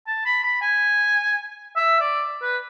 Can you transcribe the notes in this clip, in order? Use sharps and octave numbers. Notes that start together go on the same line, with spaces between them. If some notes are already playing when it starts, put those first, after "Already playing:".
A5
B5
B5
G#5
E5
D5
B4